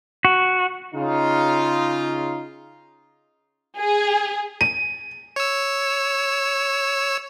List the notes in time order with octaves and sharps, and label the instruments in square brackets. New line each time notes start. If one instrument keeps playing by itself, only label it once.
[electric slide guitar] F#4
[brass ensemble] C#3 D#4 F4
[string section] G#4
[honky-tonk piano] D#7
[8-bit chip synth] C#5 E6